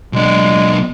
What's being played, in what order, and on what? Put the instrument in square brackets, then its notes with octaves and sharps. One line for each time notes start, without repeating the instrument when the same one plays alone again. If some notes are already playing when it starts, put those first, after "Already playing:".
[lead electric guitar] B1 D4 [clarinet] G#3